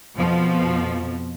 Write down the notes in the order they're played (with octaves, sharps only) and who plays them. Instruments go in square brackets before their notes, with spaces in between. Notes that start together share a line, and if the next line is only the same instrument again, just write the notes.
[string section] F2 B2 F3